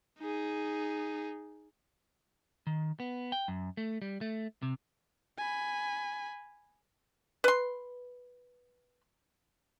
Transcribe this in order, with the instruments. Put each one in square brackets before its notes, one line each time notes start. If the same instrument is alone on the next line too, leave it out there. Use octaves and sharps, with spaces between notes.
[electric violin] D#4 G#4
[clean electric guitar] D#3
B3
G5
F#2
A3
G3
A3
C3
[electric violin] G#5 B5
[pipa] B4 C6